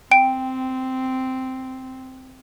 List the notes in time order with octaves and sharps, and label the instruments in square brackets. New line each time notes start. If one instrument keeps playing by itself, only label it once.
[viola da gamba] C4 [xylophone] G5 D7